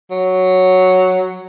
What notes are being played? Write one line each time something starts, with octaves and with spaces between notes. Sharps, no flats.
F#3